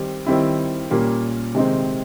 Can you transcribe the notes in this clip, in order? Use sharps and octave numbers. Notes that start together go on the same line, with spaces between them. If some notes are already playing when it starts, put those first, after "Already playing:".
Already playing: D#3 G3 C4 G4
D#3 G3 C4 E4
A#2 G3 A#3 C#4
C3 D#3 G#3 C4 D#4